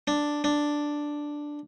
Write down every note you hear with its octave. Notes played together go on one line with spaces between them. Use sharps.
D4
D4